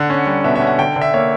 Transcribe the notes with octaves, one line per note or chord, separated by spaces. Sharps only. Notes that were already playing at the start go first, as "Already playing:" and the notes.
Already playing: D3 F#5
C#4
G3
B2 E5
E5
C#4
F#5
D3 G5
D3
E5
A#3 C#5